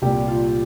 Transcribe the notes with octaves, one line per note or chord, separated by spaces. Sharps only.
C2 A#2 G3 G4
F4